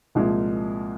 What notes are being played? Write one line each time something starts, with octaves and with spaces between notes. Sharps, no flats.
C2 A#2 F3 G#3